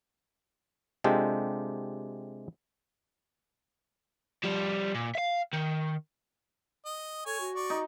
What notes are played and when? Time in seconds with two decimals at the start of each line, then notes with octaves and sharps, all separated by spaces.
1.04 C3 G#3 D4 F4 G4 A4
4.43 F3 G3
4.94 A#2
5.15 E5 F5
5.54 D#3
6.85 D#5
7.26 A4 C#5 G#5
7.40 F#4
7.55 D5 C#6
7.70 D#4